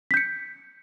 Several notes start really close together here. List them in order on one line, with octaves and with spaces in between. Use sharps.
B6 G6 C#7